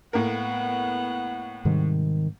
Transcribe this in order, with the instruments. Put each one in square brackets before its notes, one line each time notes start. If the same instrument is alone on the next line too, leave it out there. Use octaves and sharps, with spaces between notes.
[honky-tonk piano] A2 A#3 A#4 [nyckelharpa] B3 F#5
[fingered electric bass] G#2 C3 G3 [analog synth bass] D#3